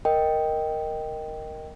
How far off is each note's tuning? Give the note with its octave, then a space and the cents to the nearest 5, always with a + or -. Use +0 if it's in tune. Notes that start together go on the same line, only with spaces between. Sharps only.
A#4 +0 D#5 +0 G5 +0